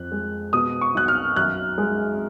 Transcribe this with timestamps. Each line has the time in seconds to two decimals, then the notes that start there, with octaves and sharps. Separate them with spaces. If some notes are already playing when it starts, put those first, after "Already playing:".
Already playing: F2 F#6
0.12 G#3
0.53 B2 D#6
0.81 C#6
0.95 B1 F#6
1.08 F6
1.36 F#2 F#6
1.78 G#3